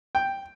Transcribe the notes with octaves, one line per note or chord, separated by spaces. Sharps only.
G5